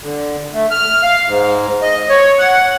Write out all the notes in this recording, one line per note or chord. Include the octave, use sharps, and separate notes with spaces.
D3
A3
F6
F5
G#2
D#5
C#5
F#5